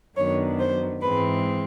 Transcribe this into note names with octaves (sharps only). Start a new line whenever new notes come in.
F#2 D#3 F#3 B3 D4 C#5
C5
G#2 E3 G#3 C4 B4